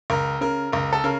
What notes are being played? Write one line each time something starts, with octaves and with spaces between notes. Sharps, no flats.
C#2 A#4
C#3 A#4
C#2 A#4
A4
C#3 A#4